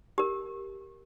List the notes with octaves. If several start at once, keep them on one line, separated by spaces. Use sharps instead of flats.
G4 A#4